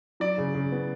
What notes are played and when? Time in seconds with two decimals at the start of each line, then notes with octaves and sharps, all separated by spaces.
0.20 F#3 D5
0.38 C#3
0.54 C#3
0.72 B3